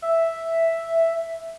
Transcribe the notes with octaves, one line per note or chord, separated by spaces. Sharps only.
E5